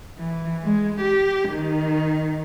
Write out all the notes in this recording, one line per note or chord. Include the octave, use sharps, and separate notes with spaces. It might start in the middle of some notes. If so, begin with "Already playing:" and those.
E3
G#3
G4
D#3